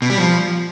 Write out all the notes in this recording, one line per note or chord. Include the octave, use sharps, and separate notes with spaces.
B2
G3
F3